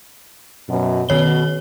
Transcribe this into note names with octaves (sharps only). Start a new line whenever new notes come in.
F#2 B2
B2 D#3 C#5 G7